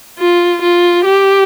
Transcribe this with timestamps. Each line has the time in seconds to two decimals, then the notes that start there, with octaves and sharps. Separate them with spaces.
0.19 F4
0.62 F4
1.05 G4